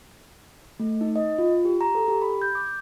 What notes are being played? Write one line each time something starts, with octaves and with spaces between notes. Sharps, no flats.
A3
D#4
D#5
F4
G4
A#5
A4
G4
B5
G6
D6